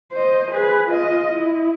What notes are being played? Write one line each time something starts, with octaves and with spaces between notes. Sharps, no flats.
C5 D#5
G#4 B4
F4 D#5
E4